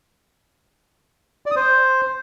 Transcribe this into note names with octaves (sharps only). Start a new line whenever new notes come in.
D5
D#6
C5